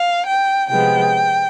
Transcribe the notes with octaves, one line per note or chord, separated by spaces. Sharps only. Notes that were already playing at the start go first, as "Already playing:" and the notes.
Already playing: F5
G5
C3 F3 G#3 B3 G5